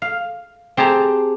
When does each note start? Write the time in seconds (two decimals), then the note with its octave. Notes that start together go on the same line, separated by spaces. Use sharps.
0.02 F5
0.77 C4 G4 G#4 A5 A#5